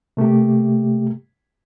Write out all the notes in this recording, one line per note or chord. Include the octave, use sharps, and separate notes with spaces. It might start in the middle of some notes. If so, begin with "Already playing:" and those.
C3 A3 A#3 G4